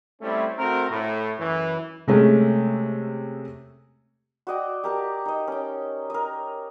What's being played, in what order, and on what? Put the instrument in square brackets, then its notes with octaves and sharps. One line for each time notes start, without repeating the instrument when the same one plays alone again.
[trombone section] G3 A3 C4 C#4 E4
A3 C4 F#4 A#4
A2
F#2 E3
[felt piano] C3 G#3 A3 C#4
[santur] F#4 D5 D#5 G5
G4 A#4 A5 A#5
D#4 D#5
C#4 G5
A#4 D#5